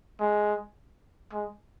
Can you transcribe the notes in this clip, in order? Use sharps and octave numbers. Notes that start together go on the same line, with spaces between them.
G#3
G#3